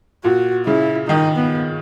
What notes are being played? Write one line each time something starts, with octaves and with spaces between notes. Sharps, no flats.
A#2 F#4
C#3 E4
D#3 D#4
B3